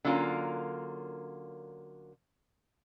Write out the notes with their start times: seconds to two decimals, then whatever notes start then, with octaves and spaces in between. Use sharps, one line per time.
0.05 D3 F#3 A#3 C#4 F4 A#4